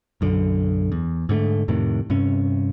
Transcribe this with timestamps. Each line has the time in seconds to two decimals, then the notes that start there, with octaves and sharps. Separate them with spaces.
0.21 B1 F#2 D3
0.92 E2
1.29 G#2 D3 G#3 A3
1.68 F2 A2 C3 D#3
2.10 G2 C3 C#4